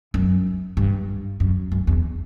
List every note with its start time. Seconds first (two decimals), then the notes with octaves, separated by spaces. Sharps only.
0.14 F#2
0.77 G2
1.40 F#2
1.72 F#2
1.87 E2